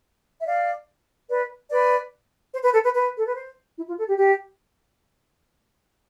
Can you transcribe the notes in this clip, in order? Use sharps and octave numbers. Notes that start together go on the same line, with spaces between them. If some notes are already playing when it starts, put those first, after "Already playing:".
E5
D5 F5
B4 D5
B4 D5
C5
B4
A4
B4
B4
A4
B4
C5
E4
F4
A4
G4
G4